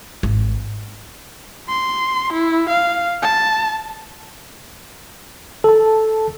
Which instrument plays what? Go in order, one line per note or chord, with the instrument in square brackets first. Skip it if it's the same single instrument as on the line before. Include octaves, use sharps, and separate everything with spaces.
[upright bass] G#1
[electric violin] C6
E4
F5
A5
[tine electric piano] A4 A5